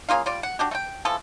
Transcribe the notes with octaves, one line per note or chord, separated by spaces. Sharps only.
C#3 A#3 F4 F5
G3 F4 D5
F#5
D4 F#4 G4
A3 G5
E3 F3 F4 A4